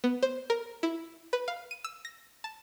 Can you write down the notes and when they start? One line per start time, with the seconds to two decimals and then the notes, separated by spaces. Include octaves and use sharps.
0.04 B3
0.23 C5
0.50 A#4
0.83 E4
1.33 B4
1.48 F5
1.71 D#7
1.85 E6
2.05 A#6
2.44 A5